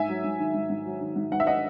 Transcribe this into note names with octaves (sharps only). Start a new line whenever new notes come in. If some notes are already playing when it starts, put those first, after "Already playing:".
Already playing: G#2 E5 G#5
F#3
G#2
D#3
G#2
G#2
F#3
D#3
G#2
G#2 F#5
E5
D#5 F#5